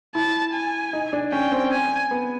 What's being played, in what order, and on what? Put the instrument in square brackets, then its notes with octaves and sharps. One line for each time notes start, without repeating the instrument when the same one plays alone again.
[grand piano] E4 [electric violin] A5
[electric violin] G#5
[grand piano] D#4
D4
[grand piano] C#4 [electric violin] G5
[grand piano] C4
[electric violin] G#5
[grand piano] B3